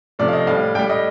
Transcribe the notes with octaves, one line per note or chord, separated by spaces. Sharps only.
C3 F3 A3 D5
F5
D#5
A2 G3 F5
A2 G3 G5
D#5